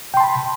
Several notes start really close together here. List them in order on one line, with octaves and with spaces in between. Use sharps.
G5 C6 A5 B5